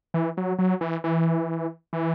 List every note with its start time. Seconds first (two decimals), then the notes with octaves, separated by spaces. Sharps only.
0.14 E3
0.37 F#3
0.59 F#3
0.81 E3
1.04 E3
1.93 E3